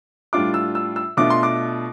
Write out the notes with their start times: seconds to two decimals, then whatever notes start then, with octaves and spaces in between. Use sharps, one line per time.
0.33 A2 G3 D4 F4 D6
0.54 E6
0.75 E6
0.96 E6
1.17 B2 A3 D4 F4 D6
1.30 C6
1.43 D6